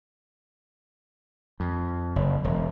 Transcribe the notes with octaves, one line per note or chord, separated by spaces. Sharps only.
F2
F#1
E1